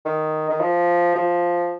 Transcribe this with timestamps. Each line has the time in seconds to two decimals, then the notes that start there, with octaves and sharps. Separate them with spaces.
0.05 D#3
0.50 D#3
0.60 F3
1.16 F3